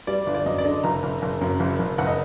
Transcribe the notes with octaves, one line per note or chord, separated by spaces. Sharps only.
G3 D5
G1
D5
F#2 D#5
D5
D3 D#5
F#1 A#5
F#1
F#1
F#2
F#1
F#1
F#1 F#5
D#5